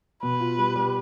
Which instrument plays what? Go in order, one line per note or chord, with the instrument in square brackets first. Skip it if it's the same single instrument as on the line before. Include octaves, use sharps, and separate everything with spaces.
[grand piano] B2 [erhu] B4
[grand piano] F4
G3
G3